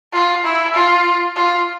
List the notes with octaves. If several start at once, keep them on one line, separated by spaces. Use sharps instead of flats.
F4
E4
F4
F4